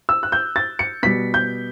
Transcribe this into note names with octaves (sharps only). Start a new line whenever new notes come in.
E6
F#6
G6
A6
C#7
B2 G3 B6
G6